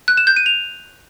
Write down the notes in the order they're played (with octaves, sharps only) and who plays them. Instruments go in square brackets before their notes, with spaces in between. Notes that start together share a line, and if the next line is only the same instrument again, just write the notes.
[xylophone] F#6
E7
G6
D#7
F7